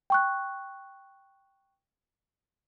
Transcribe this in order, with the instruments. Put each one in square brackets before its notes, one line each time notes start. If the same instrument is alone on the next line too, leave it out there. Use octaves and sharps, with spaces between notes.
[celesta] G5 C#6 F#6